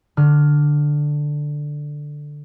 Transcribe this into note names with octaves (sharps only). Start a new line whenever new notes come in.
D3 F6